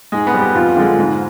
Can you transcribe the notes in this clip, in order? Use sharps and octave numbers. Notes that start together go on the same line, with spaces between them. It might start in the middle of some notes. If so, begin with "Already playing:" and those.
G#2 G#3 G#4
B3 B4
G3
G4
F2 F4
D3 F3 G#3
G#2